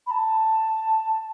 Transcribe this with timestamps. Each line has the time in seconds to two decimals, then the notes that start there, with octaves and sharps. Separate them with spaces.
0.06 B5
0.11 A5